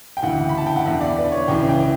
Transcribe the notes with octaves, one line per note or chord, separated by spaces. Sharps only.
G5
D2 C#3 E3 F#5
B5
A5
G5
F#5
E2 D3 E5
D5
B4
C#5
C#2 C#3 E3 G5
G5